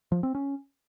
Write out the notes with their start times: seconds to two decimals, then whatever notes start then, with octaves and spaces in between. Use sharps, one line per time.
0.12 F3
0.23 C4
0.35 C#4